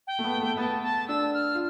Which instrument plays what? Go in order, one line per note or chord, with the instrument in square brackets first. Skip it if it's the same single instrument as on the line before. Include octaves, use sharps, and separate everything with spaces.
[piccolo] G5
[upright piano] A3
B3
A3
[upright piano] B3 [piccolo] A5
[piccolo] A5
[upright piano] D4 [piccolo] E6
[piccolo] F6
[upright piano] F4